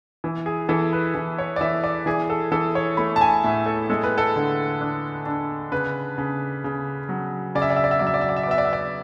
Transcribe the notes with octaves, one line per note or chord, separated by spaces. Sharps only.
E3
G#4
E3 A4
B4
E3
C#5
D5
E3 E5
D5
E3 G#4
A4
E3 A4
C#5
A3 B5
A5
G#5
A2 E5
A4
G#3 A4
B4
A4
D3
D4
D4
C#3 B4
C#3
C#3
F#3
C#3 D5
E5
D5
E5
D5
E5
F#3 D5
E5
D5
E5
D5
E5
D5
B3 E5
D5
E5
D5